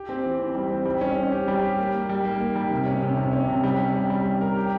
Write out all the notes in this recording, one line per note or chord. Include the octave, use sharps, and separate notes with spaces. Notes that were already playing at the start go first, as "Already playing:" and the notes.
Already playing: G4
C4
E3
C4
G3
C4
G3
C#4
C#4
G4
G3
G4
A#3
A#3
G3
A#3
A#3
G3
C3
C#4
C3
C3
C#4
C3
G3
C#4
G3
G3
G3
A#4
G4